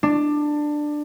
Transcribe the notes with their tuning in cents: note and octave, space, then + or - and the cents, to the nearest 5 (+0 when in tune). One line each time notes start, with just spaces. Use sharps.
D4 +15